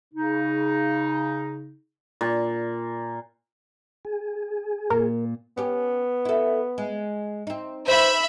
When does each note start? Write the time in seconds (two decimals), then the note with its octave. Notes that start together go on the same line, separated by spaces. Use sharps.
0.14 C#3 D#4
2.21 A#2
4.05 G#4
4.90 A#2 A#4
5.57 B3 C#4 G4
6.25 E4 A4
6.78 G#3
7.47 C4 D#4
7.88 D#4 B4 C5 E5 B5